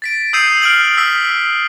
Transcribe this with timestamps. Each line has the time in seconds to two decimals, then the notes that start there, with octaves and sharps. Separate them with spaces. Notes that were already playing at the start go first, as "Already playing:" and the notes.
0.02 A6 B6 D7
0.33 D#6 E6 G6 C7 D#7 F7
0.62 F6 D7 F#7
0.97 E6 B6 F#7